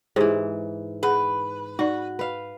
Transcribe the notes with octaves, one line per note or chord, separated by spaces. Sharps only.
G#2 E3 G4 G#4 C5
G#4 B4 F#5
D#4 F#4 D5
B4 F5